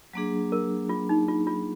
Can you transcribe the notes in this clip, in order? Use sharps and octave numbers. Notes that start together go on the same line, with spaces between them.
F#3 A#3 D4 G#4
A#4
F4
D#4
F4
F4